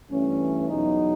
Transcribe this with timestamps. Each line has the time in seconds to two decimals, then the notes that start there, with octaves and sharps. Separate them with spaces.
0.11 G2 E3 A3 C#4
0.69 E2 B2 F#3 D#4